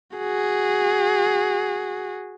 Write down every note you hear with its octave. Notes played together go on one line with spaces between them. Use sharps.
F#4 G#4